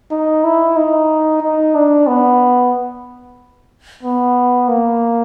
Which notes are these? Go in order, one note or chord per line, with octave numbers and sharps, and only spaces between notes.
D#4
E4
D#4
D#4
D4
B3
B3
A#3